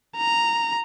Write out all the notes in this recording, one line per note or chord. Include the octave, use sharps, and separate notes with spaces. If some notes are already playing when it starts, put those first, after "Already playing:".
A#5